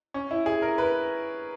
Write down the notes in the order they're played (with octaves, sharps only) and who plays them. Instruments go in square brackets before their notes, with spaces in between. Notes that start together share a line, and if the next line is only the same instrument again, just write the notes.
[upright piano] C#4
E4
G#4
A#4
B4